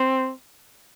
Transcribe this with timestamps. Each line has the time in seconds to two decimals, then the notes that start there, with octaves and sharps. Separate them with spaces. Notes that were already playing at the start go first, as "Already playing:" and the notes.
Already playing: C4